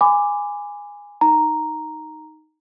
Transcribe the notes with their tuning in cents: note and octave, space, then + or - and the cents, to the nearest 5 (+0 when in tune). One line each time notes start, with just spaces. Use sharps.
G#5 -10 B5 +30 D6 +0
D#4 +0 A#5 +0